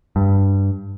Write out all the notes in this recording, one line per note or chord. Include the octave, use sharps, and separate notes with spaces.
G2